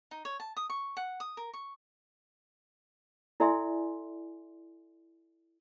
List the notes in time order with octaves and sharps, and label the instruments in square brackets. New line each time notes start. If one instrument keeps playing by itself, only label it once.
[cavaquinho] D#4
C#5
A5
D#6
C#6
F#5
D#6
A#4
C#6
[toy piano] E4 A4 D5 E5 G#5 C6